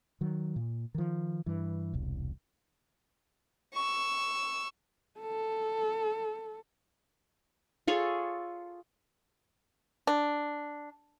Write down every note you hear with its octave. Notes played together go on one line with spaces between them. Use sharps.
D#3 F#3
A#2
D#3 F3
G2 E3
E1 C2
C#6 E6
A4
F4 G#4 A4 C#5
D4